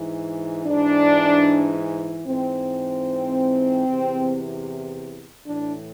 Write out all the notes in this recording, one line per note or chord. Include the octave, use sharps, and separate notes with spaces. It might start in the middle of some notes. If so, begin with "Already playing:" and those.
Already playing: G#2 E3
G#2 E3 D4
G#2 E3 C4
E2 C3 E3
A2 E3 D4